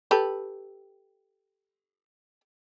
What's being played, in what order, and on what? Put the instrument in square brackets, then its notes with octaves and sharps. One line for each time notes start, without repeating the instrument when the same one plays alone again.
[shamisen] G4 A4 B4